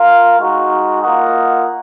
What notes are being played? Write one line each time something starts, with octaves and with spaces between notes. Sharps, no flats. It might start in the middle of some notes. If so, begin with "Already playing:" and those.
Already playing: F4 A#4 F5
G#3 D#4 F#4
A#3 F4 A#4 D#5 F#5